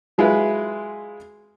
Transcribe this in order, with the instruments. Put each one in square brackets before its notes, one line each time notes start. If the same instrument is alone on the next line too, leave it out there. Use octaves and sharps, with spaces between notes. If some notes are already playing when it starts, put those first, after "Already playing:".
[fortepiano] F#3 G#3 E4 F4 G#4 B4